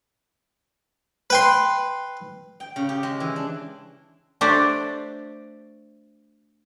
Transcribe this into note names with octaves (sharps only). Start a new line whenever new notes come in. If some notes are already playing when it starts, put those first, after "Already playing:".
B4 G5 C6
G5
C#3
G4
G#3
E3
D4
A3 D4 F#4 G4 C5 D5